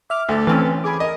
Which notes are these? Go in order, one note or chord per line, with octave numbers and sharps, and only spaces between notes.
E5 D6 F6
D2 A4
E3 C4 C#4 G#5 F6 A6
G#4 B5 D6
A#4 D#5